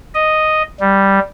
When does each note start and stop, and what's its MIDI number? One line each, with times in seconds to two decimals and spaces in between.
0.14 0.62 75
0.80 1.19 55